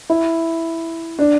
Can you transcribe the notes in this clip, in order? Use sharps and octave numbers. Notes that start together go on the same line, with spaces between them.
E4
D4